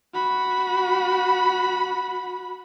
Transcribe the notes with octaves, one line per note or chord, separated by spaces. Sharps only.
F#4 B5